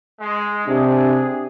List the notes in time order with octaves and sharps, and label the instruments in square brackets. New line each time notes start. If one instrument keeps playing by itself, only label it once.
[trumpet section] G#3
[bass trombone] C3 [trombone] D4 [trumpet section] G#4